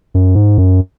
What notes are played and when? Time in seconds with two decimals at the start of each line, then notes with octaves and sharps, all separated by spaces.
0.14 F#2
0.35 G#2
0.58 F#2